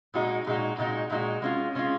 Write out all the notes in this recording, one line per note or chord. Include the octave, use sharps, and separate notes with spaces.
A#2 G#3 D#4 F#4
A#2 G#3 D#4 F#4
A#2 G#3 D#4 F#4
A#2 G#3 D#4 F#4
G#3 C#4 F4
G#3 C#4 F4